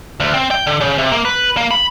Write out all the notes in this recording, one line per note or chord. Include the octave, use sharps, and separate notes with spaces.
D2
C4
G5
D3
C#3
C3
A#3
B4
A#3
B5